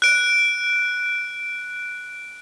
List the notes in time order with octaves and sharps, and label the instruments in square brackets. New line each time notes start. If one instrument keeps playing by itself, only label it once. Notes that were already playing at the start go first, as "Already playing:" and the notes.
[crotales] F#6 D7